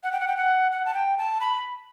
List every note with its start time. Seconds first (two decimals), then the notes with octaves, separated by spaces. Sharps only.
0.03 F#5
0.12 G5
0.20 F#5
0.28 G5
0.37 F#5
0.72 F#5
0.85 A5
0.94 G5
1.18 A5
1.41 B5